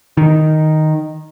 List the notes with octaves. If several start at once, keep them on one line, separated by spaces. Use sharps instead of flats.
D#3